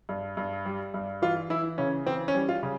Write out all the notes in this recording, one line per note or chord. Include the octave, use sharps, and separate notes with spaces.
G2
G2
G3
G2
E3 F4
E3 E4
C#3 C#4
E3 C4
C#4
G3
F4
C#3